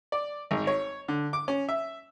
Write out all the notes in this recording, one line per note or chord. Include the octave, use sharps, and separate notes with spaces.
D5
G#1
C#5
D3
D6
C#4
E5